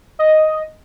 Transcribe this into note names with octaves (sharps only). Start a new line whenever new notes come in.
D#5